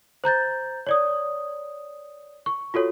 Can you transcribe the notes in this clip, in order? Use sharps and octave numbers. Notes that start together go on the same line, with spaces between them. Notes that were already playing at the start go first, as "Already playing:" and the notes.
C5 A#5 G6 A6
C#5 D5 D#6
C#6
F4 F#4 A4 C#5